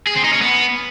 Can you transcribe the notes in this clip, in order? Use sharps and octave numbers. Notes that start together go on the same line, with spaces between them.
G#4
C4
D#4
C#4
B3